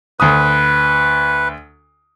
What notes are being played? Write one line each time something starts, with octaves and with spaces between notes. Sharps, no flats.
D2 B4 D#6